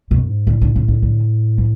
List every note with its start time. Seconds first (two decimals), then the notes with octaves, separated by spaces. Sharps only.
0.10 F#2 B2
0.29 G#2
0.47 A2 D3
0.62 D3
0.76 C#3
0.88 D3
1.02 D3
1.58 E3